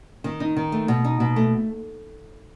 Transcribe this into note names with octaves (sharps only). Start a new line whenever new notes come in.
D#3
D#4
D#3
A3
B2
D#4
B2
A3